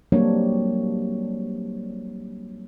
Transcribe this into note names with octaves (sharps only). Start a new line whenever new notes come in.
F#3 G3 A#3 C4 D4 C#5